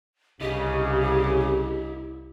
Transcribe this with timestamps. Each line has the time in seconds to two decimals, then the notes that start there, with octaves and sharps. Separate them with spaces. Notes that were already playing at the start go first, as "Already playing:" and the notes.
0.41 C2 C#3 E4 G4 D#5